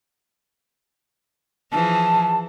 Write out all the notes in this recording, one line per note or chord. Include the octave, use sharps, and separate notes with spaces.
E3 F3 G#4 A5